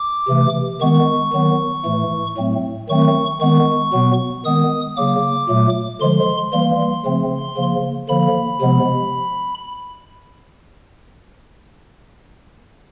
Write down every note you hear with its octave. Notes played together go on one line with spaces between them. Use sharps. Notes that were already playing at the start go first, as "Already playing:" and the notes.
Already playing: D6
C3 E3 A3
D#3 G#3 B3 C#6
D#3 F#3 B3
A2 E3 A3
A2 F#3 A3 C4
D#3 F#3 A3 C4 C#6
D#3 G#3 B3 C#6
B2 F#3 B3
D#3 G#3 B3 D#6
C#3 F#3 A#3 D6
A#2 F#3 A3
D3 F3 G#3 C6
E3 G3 A#3 C6
C#3 F3 A3 C4
C#3 F3 A#3
D3 F3 A#3 B5
C3 F3 G#3 B3